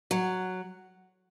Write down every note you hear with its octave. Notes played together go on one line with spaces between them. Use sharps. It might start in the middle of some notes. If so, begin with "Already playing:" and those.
F#3